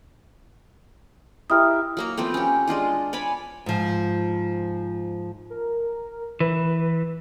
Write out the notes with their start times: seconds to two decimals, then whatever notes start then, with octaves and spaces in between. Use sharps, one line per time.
1.50 E4 G4 A#4 D#6 F6
1.97 F#3 A#3 A#5
2.18 F3 A3 B3 C4
2.34 C#4 G4
2.68 G#3 D4 F4 D#5
3.13 C#5 D5 G#5 B5
3.66 G#2 F3
5.50 A#4
6.40 E3 B4